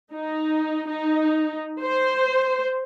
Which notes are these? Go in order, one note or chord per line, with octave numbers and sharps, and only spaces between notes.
D#4
D#4
C5